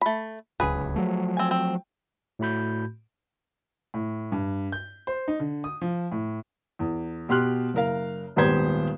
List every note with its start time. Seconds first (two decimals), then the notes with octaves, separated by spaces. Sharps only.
0.01 A3 B5
0.60 D1 C#2 G#4 B4
0.96 F3 F#3 A3
1.37 C4 G#5
1.51 C4
2.39 A2 A3 F#4 B5 G6
3.94 A2
4.32 G2
4.72 G6
5.07 C5
5.28 D#4
5.40 D3
5.64 D#6
5.81 F3
6.12 A2
6.79 E2
7.29 B2 G4 C6 F6 F#6
7.74 F#1 A#4 F5
8.36 D#1 G#1 B3 G4 C5 G#6